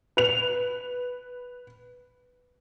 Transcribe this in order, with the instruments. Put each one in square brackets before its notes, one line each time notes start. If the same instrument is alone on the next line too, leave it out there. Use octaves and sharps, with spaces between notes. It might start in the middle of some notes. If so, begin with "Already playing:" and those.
[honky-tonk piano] B4 F7